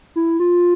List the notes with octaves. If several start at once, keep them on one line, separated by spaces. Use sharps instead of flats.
E4
F4